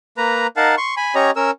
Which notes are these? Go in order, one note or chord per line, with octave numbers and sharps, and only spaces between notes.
A#3 B4 A#5
D#4 A#4 F5 F#5 A5
C6 C#6
G#5 B5
C#4 G4 C#5 D#5 A#5
C#4 A#4 E6